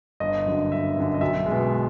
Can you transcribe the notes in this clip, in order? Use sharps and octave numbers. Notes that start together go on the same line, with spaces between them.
G1 D#5
F#2 D3
G1 E5
F#2 D3
D#5
B1 E5
G#3
B2